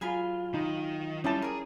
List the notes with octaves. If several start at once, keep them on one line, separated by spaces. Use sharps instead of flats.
F#3 F4 G#4 G#5 B5
D#3 D#4
G3 C#4 E4 D#5 G5 A5 D6
G#4 A#4 D5